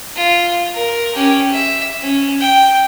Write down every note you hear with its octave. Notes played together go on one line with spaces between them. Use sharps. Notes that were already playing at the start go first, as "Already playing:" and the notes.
F4
A#4
C#4 G4
E5
C#4
G5